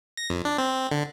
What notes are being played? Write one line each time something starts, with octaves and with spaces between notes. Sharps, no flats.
A#6
F2
D4
C4
D3